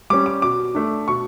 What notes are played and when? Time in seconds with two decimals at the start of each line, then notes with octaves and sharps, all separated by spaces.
0.10 G3 C#4 D6
0.26 D6
0.42 B2 D6
0.75 A3 D4
1.08 B2 C#6